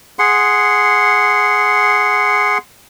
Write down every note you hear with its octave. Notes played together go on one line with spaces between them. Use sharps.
G#4 F#5 C6